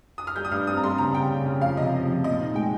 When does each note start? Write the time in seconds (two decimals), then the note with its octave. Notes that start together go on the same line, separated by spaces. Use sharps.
0.18 D#6
0.27 F6
0.36 G3 G6
0.45 D#6
0.51 G2 F6
0.67 C4 D#6
0.77 A#5
0.84 G3 C6
0.98 C#3 A#5
1.14 C#3 G5
1.30 C#3
1.46 C#3
1.61 F3 F5
1.77 C3 D#5
1.93 F3
2.08 F3
2.24 A#2 D#5
2.39 D#4
2.55 G#3 G5